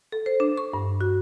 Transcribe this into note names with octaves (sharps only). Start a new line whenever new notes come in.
A4
C5
D4
C#6
G2
F#4